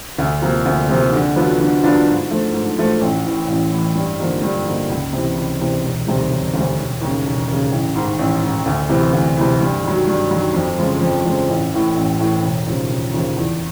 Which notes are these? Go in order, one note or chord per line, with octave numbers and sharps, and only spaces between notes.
D2
C3 F3 A#3
D2
C3 F3 A#3
D3
F#3 B3 D4 F4
D3
F#3 B3 D4 F4
G#2
F3 A3
G#2
F3 A3
A1
A2 E3
A1
A2 E3
G2
D3 F3 A#3 D#4
G2
D3 F3 A#3 D#4
C#2
C3 E3
C#2
C3 E3
E1
D2 C3 D#3 G3
E1
D2 C3 D#3 G3
E1
D#2 C#3
E1
D#2 C#3
A1
G#2 D#3
A1
G#2 D#3
D2
C3 E3
D2
C3 E3
G2
D#3 F#3
G2
D#3 F#3
F2
C#3 F3 G#3
F2
C#3 F3 G#3
A1
A2 E3
A1
A2 E3
E1
D#2 C#3 F3
E1
D#2 C#3 F3
E2